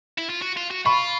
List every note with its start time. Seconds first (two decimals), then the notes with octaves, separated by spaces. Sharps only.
0.18 E4
0.30 F4
0.42 F#4
0.57 F4
0.71 F#4
0.86 F4 B5 C#6